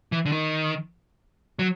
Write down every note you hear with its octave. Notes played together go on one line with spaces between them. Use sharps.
E3
D3
D#3
F#3